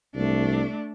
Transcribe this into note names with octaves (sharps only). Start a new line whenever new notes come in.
C2 A3 D4